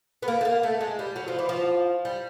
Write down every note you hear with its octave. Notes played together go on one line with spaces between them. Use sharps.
B3
A#3
A3
A#3
A3
G#3
G3
F#3
F3
E3
F3
G3